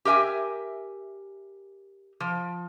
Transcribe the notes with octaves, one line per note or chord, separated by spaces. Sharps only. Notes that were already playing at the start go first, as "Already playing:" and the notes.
G4 A#4 E5 G#5
F3